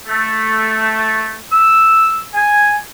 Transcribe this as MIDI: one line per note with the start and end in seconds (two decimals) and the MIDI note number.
0.07 1.35 57
1.52 2.20 88
2.34 2.74 80